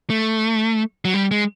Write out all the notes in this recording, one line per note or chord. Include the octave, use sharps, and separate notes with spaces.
A3
F#3
G3
G#3